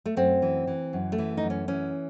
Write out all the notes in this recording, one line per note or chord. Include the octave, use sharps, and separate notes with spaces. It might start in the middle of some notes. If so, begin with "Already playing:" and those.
A3
F#2 C4
E3
E3
F#2
A3
E3
D#4
F#2
C#4
E3 C#4